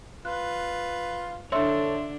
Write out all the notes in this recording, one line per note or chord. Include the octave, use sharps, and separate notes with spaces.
F4 B4 F#6
D3 D4 A4 C#5 E5 C6 E6